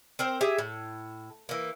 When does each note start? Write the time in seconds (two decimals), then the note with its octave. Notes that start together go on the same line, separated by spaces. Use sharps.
0.19 C4 A#4 C5
0.41 G4 G#4 E5
0.58 A2
1.49 E3 A#3